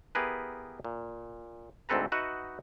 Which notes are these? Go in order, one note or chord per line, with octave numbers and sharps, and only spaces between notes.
B3 E4 G4 G#4 A#4 B4
A#2
D2 G#2 C4 A4 B4 A#5
D#4 F#4 B4 D#5 E5 F#5